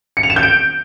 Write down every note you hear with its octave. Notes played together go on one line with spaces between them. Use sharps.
C#7
F7
E7
G6
D7